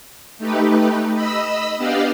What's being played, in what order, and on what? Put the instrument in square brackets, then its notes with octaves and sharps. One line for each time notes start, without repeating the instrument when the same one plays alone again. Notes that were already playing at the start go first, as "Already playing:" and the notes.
[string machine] A3 D#4 G4 B4
D#5 B5 E6
B3 D4 G4 D5 D#5 F5